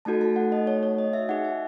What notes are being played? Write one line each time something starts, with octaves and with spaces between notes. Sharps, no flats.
A3 D#4 F#4 A4 A5
A5
F#5
D#5
C#5
C#5
D#5
E5
D#4 G#4 F#5
E5